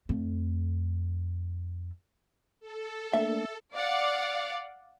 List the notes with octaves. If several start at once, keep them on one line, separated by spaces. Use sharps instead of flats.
F2 A3
A4
A3 A#3 D4 E5
D5 F5 F#5 D6